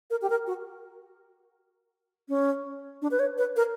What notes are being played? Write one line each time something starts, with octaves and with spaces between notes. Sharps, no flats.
A#4
G4
A#4
F#4
C#4
D4
B4
C#5
B4
A#4